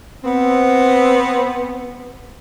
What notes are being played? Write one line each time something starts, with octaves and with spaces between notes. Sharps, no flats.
B3 C4